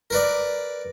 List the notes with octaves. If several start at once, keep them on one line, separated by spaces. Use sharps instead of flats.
A#4 B4 D5